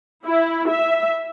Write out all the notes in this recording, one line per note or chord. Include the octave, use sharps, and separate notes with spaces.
E4
E5